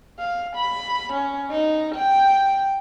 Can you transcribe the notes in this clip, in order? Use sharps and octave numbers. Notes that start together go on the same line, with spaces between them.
F5
B5
C#4
D#4
G5